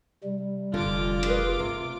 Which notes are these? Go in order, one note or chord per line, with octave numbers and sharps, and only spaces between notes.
C3 G3
F1 D3 F4 D6
G#4 A#4 B4
C3 A3